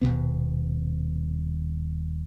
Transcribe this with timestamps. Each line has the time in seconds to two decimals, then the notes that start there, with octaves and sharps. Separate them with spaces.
0.01 D#1 D#2 B2 B3